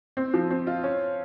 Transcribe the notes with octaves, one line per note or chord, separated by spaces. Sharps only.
C4
F3
C4
F4
C#4